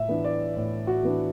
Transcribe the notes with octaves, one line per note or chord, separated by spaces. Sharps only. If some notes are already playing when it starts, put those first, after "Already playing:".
Already playing: A2 E5
E3 B3 D4
D5
A2
F#4
E3 B3 D4